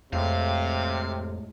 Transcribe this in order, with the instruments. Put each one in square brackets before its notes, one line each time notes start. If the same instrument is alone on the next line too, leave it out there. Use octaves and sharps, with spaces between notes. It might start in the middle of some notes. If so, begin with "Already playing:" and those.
[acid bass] F2 [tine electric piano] A2 G#3 [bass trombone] C3 [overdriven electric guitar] F5